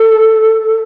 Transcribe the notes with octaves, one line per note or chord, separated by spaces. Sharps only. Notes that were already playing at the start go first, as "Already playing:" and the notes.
Already playing: A4